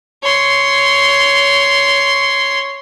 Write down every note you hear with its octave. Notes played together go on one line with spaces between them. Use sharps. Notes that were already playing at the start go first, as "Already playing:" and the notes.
C#5 C6